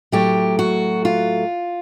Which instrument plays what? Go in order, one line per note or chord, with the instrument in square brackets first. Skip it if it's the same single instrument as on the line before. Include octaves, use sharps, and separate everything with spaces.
[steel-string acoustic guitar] A2 F#3 A3 G4
F#4
F4